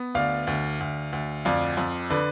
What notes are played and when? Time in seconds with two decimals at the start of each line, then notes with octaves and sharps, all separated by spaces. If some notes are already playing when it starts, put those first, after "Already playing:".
Already playing: B3
0.15 D2 D5 F5
0.47 D2
0.80 D2
1.13 D2
1.45 F2 D5 F5
1.77 F2
2.10 D3 B4 D5